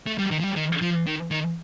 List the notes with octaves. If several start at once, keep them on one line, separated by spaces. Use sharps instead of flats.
A3
G3
D#3
F3
G3
D#3
F3
D#3
D#3